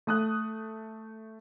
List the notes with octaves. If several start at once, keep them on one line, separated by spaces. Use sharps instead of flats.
A3 D#6 F#6